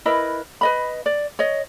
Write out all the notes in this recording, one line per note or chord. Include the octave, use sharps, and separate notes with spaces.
E4 A#4 B4 D#5
B4 D#5 B5
D5
C#5 D#5